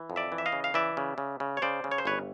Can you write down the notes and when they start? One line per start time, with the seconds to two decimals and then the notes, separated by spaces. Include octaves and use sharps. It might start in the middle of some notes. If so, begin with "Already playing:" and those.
Already playing: E3
0.10 F2
0.16 D5 E5
0.32 E3
0.38 E5
0.46 D#5 F5
0.52 C#3
0.64 F5
0.74 E3 D5 E5
0.97 C#3
1.18 C#3
1.40 C#3
1.57 C#5
1.62 C#3 C5 D5
1.84 C#3
1.91 C#5
1.98 C5
2.05 G1 B4 C#5